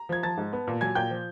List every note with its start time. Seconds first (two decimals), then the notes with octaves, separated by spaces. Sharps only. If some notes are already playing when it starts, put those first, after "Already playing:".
Already playing: A#5
0.09 F3 G#6
0.23 F3 A5 A6
0.37 G#2
0.53 B3
0.67 A#2
0.81 F#3 G#5 G#6
0.95 A#2 G5 G6
1.10 F3